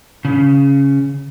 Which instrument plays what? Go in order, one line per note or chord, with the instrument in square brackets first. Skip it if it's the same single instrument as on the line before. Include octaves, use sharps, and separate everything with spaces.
[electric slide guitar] C#3